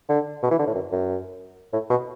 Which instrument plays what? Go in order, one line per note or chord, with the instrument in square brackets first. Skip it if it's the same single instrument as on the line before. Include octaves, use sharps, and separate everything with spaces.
[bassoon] D3
B2
E3
D3
A2
F#2
F#2
A2
B2